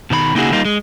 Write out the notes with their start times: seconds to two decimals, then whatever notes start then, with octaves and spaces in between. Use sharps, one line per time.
0.10 B2 D#3 D5 B5
0.35 C#3 A#3 D#4 E4 F#4 G#4
0.52 G3 A#3 D#4 F4
0.65 G#3